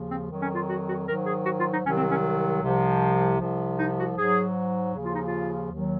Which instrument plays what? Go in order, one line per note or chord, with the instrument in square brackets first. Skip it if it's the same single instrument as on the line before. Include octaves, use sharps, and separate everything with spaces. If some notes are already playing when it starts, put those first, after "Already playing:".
Already playing: [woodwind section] D#2 C#3 F3
C4
F2 D#3 F#3
C#4
F4
F#4
F#4
G#2 D#3 F#3 A#4
G#4
F#4
F4
D#4
C2 C3 D#3 F#3 C#4
C4
C#4
C2 C3 F3
C2 C3 F3
D#4
F#4
G#2 F#3 G#4
D#2 C#3 F3
F4
D#4
F4
D#2 D#3 F#3